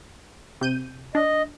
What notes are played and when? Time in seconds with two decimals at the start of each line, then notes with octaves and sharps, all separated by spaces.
0.61 C3 G6 D#7
1.15 D4 D#5